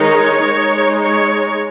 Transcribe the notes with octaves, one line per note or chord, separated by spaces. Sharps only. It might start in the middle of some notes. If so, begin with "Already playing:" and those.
Already playing: D#3 G#3 D#4 C#5
G#3 D#4
C#5